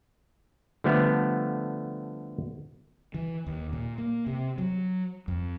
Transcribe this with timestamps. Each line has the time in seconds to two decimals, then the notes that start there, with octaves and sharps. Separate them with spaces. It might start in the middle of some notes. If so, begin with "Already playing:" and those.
0.84 D3 F3 G3 A3 B3
3.14 E3
3.46 D#2
3.73 A#2
3.98 A#3
4.26 C3
4.58 F#3
5.28 F2